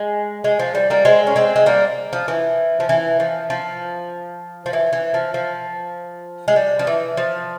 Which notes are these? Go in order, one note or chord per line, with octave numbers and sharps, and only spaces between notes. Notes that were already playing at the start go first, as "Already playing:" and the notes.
Already playing: G#3
G#3
F3
G3
G3 A#3
G#3 C4
C#4
G#3 C4
G#3
G3 A#3
F3
E3
F3
E3
F3
F3
F3
E3
E3
F3
F3
G#3
G3
F3
E3
F3